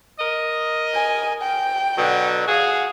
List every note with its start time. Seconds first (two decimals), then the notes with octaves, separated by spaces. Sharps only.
0.20 A#4 D#5
0.94 G#5
1.42 G5
1.98 B2 D3 F#3
2.48 F#4 G#4 F5